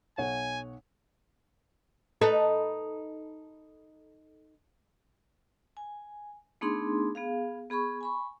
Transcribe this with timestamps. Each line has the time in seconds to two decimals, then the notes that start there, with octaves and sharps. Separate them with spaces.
0.18 B1 C#5 F#5 G#5
2.21 D#4 A4 B4
5.77 G#5
6.61 A3 B3 D4 D#4 G#4 C6
7.15 B3 G#4 F5
7.70 B3 G#4 B5 C#6
8.01 G#5 B5 C#6